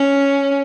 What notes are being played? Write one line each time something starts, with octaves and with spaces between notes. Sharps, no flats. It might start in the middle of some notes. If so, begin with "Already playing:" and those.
Already playing: C#4